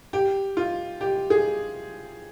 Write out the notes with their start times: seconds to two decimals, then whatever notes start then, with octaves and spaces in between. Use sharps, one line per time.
0.13 G4
0.57 F4
1.01 G4
1.30 G#4